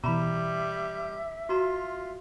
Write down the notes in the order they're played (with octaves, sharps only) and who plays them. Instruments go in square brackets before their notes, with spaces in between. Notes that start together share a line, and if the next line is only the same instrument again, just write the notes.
[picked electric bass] B2 E3 [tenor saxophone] G3 [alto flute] E5 [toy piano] A#5 B5
[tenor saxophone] F4 [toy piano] F#4 A#5